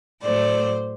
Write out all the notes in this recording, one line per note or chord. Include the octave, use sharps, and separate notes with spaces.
A2 F#3 A3 C5 D5